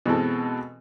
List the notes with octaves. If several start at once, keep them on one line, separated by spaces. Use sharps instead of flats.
B2 E3 G#3 C4 A4